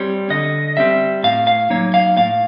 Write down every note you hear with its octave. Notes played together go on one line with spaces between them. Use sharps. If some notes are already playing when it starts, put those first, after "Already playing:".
Already playing: G3 C4 C#5
D3 D#5
G3 C4 E5
A2 F5
F5
F#3 A#3 D#4 C#5
F5
A2 F5